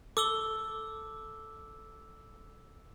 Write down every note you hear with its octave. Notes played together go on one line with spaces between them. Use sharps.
A4 D6 E6 G7